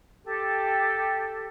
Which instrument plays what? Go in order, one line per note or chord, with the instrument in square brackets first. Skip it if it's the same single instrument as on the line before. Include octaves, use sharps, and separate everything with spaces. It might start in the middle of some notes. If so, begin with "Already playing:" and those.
[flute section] G4 A4